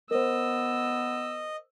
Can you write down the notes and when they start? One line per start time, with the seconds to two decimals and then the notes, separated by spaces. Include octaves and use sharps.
0.11 B3 A#4 C5 D#5 E6